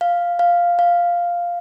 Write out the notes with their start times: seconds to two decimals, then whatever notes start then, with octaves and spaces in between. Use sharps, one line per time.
0.01 F5
0.39 F5
0.79 F5